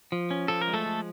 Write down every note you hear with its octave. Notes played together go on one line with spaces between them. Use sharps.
F3
C#4
F3 A4
A#4
G#3
A3 A4
F3